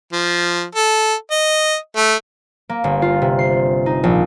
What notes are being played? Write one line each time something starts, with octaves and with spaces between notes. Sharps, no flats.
F3
A4
D#5
A3
A#3
G1
F4
C3
C7
D#4
A#1